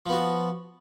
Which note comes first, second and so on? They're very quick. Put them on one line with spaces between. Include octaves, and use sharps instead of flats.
F3 B3 F#4